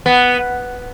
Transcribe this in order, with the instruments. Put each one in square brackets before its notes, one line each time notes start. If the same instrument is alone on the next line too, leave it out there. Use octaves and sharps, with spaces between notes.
[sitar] B3